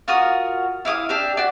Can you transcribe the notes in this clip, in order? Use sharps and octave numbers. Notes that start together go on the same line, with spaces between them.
F4 F#4 A#4 D#6
E4 F5 D6 D#6
D4 G4 E5
F#4 D5